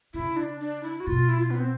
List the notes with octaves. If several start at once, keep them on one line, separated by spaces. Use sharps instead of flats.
C#3 E4
D4
D4
E4
F#4
B2 F4
E4
F4
B3
C4